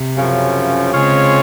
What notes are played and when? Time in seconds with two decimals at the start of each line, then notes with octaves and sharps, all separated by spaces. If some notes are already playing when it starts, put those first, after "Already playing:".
Already playing: C3
0.16 F#2 C#3 F3
0.93 C#3 G#3 C4 F4 G#4 C#5